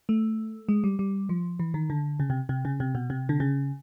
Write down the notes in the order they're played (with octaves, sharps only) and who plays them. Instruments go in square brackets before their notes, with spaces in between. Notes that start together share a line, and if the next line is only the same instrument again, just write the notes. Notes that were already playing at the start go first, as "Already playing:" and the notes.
[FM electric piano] A3
G#3
G3
G3
F3
E3
D#3
D3
C#3
C3
C3
C#3
C3
B2
C3
D3
C#3